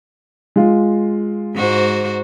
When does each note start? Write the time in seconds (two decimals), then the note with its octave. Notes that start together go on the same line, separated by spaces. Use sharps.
0.56 G#3 F4
1.54 G#2 F#4 C5